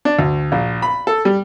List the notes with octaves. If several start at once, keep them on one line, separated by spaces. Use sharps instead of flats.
D4
D2
A#1
B5
A4
G3